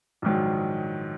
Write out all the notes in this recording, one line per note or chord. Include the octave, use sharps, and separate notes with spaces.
A#1 G#2 D#3 F#3